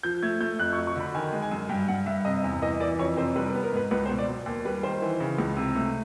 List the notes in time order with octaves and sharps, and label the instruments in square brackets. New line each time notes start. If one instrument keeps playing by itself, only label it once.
[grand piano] F3 G6
A3 G#6
A3 G6
F2 F#6
C#6
F#3
C#6
D3 B5
D#3 G#5
G#3
G#5
F#2
G2 G5
G2 F#5
G2 E5
C3 D#5
E2
E3 D#5
E3 D5
F2 C#5
C3 C5
G3 B4
B4
B3
A#4
G#2 B4
C#2 B4
C5
B2
D5
F#3
D#2
G3 B4
D#3 C5
E3
C#3
C#2
C3
A3